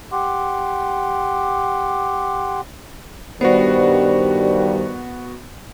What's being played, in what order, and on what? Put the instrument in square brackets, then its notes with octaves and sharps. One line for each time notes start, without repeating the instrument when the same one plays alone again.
[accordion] G4 F#5 C6 D6
[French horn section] G2 D#3 G3 [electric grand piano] B3 F#4 [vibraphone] C5 D5